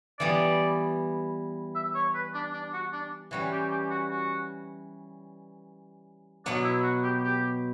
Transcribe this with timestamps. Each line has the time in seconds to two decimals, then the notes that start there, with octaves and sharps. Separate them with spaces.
0.20 E3 G3 B3 D5
1.75 E5
1.95 C#5
2.15 B4
2.34 D4
2.54 D4
2.74 F#4
2.93 D4
3.31 E3 G3 C#4 F#4
3.52 G4
3.71 G4
3.91 F#4
4.10 F#4
6.45 B2 F#3 B3 D4
6.64 E4
6.84 F#4
7.03 G4
7.24 G4